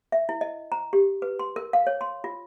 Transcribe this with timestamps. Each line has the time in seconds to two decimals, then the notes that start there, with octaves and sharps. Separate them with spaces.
0.12 E5
0.29 E4
0.41 D#5
0.72 A#5
0.93 G4
1.22 B4
1.39 C6
1.56 A#4
1.73 F5
1.87 C#5
2.01 C6
2.24 F4